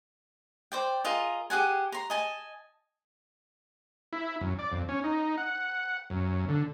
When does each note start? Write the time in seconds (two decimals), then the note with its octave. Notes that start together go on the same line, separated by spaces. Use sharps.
0.72 C5 D5 G5
1.05 F4 G#4 A#4 D#5
1.50 G4 G#4 F#5 G#5
1.92 A#5 C6
2.10 D#5 G#5 A5
4.13 E4
4.41 F#2
4.59 D5
4.72 F2
4.89 C#4
5.04 D#4
5.38 F#5
6.10 F#2
6.49 D3